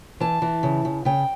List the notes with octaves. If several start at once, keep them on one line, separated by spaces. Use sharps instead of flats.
E3 A5
E3
C#3
C#3
C#3 G5